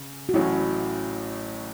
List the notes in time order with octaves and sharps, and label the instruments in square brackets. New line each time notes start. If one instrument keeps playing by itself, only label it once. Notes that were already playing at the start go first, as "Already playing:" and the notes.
Already playing: [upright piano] C#3
[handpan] F#4
[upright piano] A1 A2 F#3 C#4 [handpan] E4